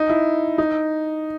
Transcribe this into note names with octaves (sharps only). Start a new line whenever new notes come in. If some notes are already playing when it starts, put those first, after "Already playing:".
Already playing: D#4
E4
D#4